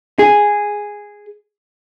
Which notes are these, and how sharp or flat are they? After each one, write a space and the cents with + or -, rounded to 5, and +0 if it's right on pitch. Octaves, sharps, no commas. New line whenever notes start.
G#4 -5